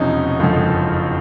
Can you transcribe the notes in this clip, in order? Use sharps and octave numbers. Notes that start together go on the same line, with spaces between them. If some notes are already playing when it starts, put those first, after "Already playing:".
Already playing: E1 E2 C3 F3 C#4 D#4
F#1 F2 D3 F3